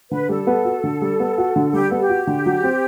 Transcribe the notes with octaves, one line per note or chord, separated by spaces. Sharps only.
D3 B4
G3 A4
B3
F#4
D3
G3
B3
F#4
D3
G3 G4
B3 A4
G4
F#4
D3
F#3
C4